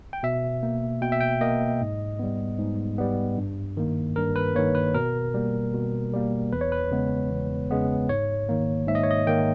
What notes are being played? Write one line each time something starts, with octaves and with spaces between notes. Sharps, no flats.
G5
B2 E5
A#3
B2 G5
E5
G5
A#3 D#5
G#2
G3 B3
G#2
G3 B3
G2
D#3 A#3
G2 A#4
B4
D#3 A#3 C#5
B4
B2 A#4
G3 A#3
B2
G3 A#3
E2 B4
C#5
B4
C#3 G#3 B3
E2
C#3 G#3 B3
G#2 C#5
D#3 A#3
G#2 E5
D#5
C#5
D#5
D#3 A#3 G5